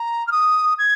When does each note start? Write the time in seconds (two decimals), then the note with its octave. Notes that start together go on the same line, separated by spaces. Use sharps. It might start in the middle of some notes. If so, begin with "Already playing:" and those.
Already playing: A#5
0.27 F6
0.31 D#6
0.78 G#6